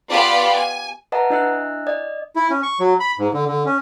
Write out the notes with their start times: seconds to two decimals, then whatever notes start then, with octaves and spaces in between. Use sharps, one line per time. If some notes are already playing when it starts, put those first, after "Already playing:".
0.11 B3 F4 G4 D5 B5
0.54 G#5
1.12 B4 D#5 E5 F#5 A5 A#5
1.30 D4 E4 D#5 E5 E6 F#6
1.87 D5 D#5
2.36 E4
2.50 C#4
2.63 C#6
2.80 F#3
3.00 B5
3.19 G#2
3.33 D3
3.48 D3
3.66 C#4